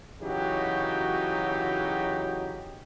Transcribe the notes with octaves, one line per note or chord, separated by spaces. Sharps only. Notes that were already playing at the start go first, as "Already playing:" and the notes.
C#3 E3 F#3 D#4 F#4 G4